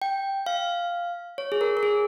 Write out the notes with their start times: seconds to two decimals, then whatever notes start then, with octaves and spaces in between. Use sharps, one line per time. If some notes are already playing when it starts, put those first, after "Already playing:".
0.02 G5
0.46 F5
1.38 C#5
1.52 G#4
1.61 A#4
1.77 A#4
1.83 G#4